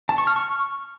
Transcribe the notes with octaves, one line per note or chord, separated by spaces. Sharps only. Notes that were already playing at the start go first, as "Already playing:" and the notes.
A5
C#6
F6
C#6